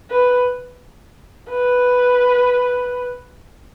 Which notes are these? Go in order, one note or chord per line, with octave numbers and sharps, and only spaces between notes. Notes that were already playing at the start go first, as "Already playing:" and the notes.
B4
B4